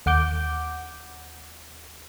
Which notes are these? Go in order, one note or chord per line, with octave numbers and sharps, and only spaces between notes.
D#2 F#5 D6 G6